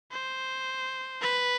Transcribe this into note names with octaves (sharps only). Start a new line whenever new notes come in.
C5
B4